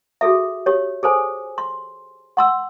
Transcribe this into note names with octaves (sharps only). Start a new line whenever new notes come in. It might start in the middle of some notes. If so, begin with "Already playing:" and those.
F#4 G#4 A4 E5
G4 C#5
G#4 A4 C5 G#5
C6
F#5 C6 E6